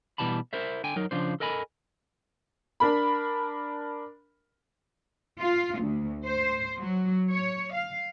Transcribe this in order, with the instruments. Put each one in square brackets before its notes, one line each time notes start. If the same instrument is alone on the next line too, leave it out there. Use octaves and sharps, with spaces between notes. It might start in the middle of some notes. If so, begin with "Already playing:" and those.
[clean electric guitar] B2 E3 G3 A5 B5
E4 A#4 C5 E5
D3 G5 G#5
F#3 D#4 A#4
C#3 F3 D4 C5
A4 A#4 D#5 G#5 B5
[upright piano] D4 A#4 B5
[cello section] F4
D2
C5
F#3
C#5
F5